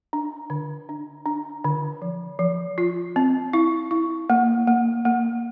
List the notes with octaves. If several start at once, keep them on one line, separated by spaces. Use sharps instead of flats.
D4
D3
D4
D4
D3
F3
F3
F4
C4
E4
E4
A#3
A#3
A#3